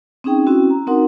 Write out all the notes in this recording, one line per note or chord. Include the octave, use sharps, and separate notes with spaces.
C4 C#4 D#4 G#4 G5
C4 C#4 E4 F#4
A#5
C4 D#4 F#4 A#4 F#5 C6